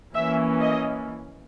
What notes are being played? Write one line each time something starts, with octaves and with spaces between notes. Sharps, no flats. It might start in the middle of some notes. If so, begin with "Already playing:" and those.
E3 A#3 C#4 E5
D#5